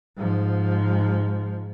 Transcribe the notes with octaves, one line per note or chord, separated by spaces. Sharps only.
G#2 F3